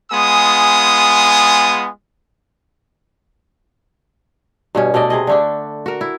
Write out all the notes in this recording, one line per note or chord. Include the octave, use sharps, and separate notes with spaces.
G#3 B3 F4 G#5 D#6
G2 B2 C#4
B2 A3 D5 D#5
C3 G#4 D#5
D3 A3 D4
F#4 A#4
E4